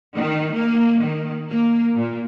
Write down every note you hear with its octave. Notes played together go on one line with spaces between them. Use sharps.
D#3
A#3
D#3
A#3
A#2